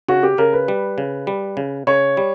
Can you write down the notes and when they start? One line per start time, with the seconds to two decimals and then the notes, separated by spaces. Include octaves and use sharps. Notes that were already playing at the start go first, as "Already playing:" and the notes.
0.08 C#3 F#4
0.23 G4
0.38 C#3 A#4
0.53 B4
0.68 G3
0.98 C#3
1.27 G3
1.57 C#3
1.87 C#3 C#5
2.17 G3